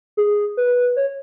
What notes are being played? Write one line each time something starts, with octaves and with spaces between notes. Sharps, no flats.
G#4
B4
C#5